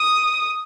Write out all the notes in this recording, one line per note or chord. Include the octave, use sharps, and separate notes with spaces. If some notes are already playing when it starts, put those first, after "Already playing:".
Already playing: D#6